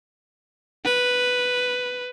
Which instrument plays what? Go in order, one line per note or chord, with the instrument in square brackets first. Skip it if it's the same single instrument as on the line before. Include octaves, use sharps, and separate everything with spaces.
[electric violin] B4